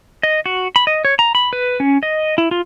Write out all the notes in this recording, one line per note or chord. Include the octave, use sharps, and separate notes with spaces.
D#5
F#4
B5
D#5
C#5
A#5
B5
B4
C#4
D#5
E4
F4